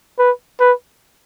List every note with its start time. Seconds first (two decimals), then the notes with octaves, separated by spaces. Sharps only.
0.19 B4
0.60 B4